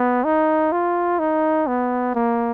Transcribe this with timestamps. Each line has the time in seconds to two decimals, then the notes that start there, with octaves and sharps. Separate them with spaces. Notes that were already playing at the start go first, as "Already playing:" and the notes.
Already playing: B3
0.24 D#4
0.72 F4
1.19 D#4
1.67 B3
2.15 A#3